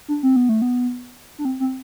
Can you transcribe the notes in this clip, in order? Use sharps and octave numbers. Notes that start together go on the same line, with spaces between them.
D4
C4
B3
A3
B3
D4
C4
C4